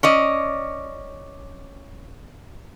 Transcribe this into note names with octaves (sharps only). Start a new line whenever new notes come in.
C#4 D5 D#5